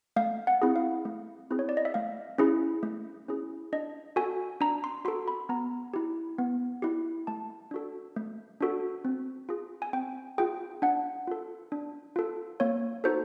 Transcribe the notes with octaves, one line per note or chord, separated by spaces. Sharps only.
A3 F5
F#5
C4 E4 G#4
F5
A3
C4 E4 G#4
C#5
D5
D#5
E5
A3 F5
C#4 E4 G#4
A3
C#4 E4 G#4
D4 D#5
F#4 A4 G#5
D4 A#5
C6
F#4 A4 C6
B5
B3 A#5
E4 G4
B3
E4 G4
A3 A5
D4 F#4 A4
A3
D4 F#4 A4
C4
F4 G#4
G#5
C4 G5
F4 G#4 G5
D4 F#5
F4 A4
D4
F4 A4
A#3 C#5
D#4 F#4 A4 C5